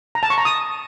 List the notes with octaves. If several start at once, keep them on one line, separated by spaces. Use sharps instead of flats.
A#5
A5
C#6
A#5
D#6